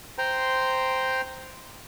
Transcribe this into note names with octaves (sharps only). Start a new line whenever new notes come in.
C5 G5 A#5 C6